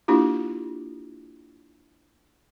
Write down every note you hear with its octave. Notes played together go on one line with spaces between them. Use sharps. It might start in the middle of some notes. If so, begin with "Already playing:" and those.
A#3 D4 E4 F4 G4